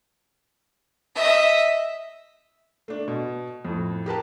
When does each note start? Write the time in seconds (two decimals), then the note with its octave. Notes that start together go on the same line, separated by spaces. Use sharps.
1.15 D#5 E5
2.88 A3 D4
3.08 B2
3.65 F2 A2
4.06 G4 A#4 B4 A5